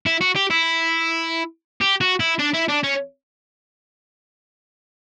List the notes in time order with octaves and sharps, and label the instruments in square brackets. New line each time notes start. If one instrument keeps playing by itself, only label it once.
[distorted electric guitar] E4
F#4
G4
E4
G4
F#4
E4
D4
E4
D4
C#4